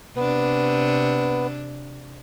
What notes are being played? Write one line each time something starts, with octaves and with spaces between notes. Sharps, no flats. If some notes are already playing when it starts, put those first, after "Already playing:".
C3 B3 D4